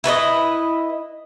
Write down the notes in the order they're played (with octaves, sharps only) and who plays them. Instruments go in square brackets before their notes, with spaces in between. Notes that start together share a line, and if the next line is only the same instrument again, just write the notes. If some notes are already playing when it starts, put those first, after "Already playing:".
[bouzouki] E4 B4 C#5 D#5